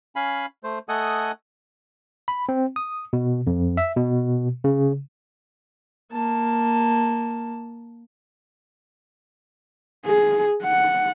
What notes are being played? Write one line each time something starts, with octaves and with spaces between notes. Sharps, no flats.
C#4 F5 G#5 B5
A3 C5
A3 A4 D#5 F#5 G#5 D#6
B5
C4
D#6
B2
F2
E5
B2
C#3
A#3 A5
G#4
F#5